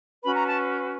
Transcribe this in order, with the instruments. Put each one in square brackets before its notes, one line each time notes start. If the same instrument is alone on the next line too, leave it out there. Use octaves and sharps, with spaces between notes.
[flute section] C#4 F#4 B4 B5
A#5
A5